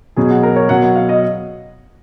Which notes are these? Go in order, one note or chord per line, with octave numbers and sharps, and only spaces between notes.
B2 F#3 G#4
F#4
A#4
C#5
B2 F#3 F#5
F#5
F5
D#5